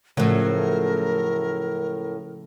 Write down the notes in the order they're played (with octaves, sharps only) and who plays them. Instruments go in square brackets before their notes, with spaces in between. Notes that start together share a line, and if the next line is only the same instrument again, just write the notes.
[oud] A2 F#3 [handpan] C#3 F3 A3 [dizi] A#4